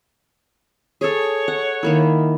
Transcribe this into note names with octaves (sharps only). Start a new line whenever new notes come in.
G#4 A4 C#5
F#5
D#3 A#3 E4